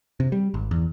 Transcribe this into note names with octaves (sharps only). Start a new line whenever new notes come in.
C3
G3
G#1
E2